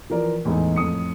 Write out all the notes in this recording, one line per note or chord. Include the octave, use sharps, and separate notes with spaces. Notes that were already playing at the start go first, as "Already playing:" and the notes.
E3 F3 A#4 D5
E2 A2 G#3 D#4
F2 A2 D#6 C#7